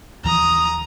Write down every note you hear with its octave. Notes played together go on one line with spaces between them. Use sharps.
D#2 E3 F3 A#5 D#6